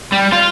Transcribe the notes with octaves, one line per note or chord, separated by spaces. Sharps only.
G3
F4